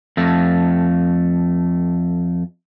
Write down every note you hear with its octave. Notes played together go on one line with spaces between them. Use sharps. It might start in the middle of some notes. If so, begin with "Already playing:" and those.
F2 A3